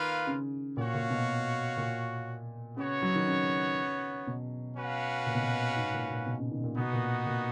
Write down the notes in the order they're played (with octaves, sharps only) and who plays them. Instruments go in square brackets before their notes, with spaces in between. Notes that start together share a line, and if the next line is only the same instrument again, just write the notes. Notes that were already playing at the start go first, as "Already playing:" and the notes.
Already playing: [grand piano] D#3 [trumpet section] A#3 F4 B4 F5
[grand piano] C#3
[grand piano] A#2 [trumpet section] F#4 C#5 F5
[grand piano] A#2
B2
A#2
[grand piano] C#3 [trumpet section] B3 F#4 C#5
[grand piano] F#3
D#3
C#3
B2
[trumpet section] C#4 F#4 B4 F5
[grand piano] A#2
B2
A#2
G#2
A#2
A#2
B2
C#3
D#3
A#2
[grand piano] B2 [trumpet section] B3 D#4 F#4
[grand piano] A#2
A#2